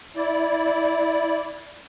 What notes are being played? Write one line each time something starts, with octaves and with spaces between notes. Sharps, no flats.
E4 D5